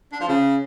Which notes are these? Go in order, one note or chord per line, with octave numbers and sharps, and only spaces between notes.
D4
F3
C#3